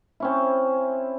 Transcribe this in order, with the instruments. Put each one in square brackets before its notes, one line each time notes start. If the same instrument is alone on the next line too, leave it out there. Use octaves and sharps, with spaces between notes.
[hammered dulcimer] C4 C#4 E4